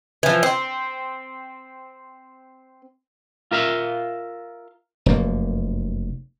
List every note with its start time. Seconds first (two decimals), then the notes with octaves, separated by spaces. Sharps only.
0.23 E3 F3
0.43 C4
3.51 F4 A#4 E5 F5
5.06 F1 F#2 A#3